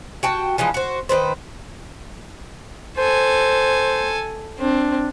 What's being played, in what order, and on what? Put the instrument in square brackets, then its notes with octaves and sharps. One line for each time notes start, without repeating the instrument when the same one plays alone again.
[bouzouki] F#4 G5 A5
E3 F3 G#3 D4
F#4 C5
D#3 F#3 B4 C5
[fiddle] A4 G#5 [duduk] C5
[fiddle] C4 [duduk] D4